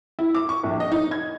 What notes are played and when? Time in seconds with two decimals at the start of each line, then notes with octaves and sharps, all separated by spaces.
0.19 E4
0.35 D6
0.49 C#6
0.63 A#1
0.80 D#5
0.92 D#4
1.11 G#6